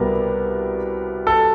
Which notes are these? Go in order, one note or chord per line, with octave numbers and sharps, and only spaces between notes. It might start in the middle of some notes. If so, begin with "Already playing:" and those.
Already playing: C2 B2 G3 B3 A#4
A4